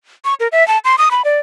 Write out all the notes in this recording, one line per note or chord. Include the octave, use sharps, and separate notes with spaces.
C#6
A#4
E5
A5
C6
D#6
B5
D5